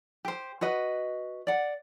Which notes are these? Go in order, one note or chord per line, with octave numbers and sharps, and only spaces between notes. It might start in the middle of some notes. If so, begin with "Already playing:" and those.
G4 C5
F#4 B4 D#5
D5 F#5